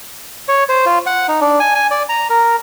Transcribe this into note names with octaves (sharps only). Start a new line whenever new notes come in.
C#5
C5
F4
F#5
D#4
D4
G#5
G#5
D5
A#5
A#4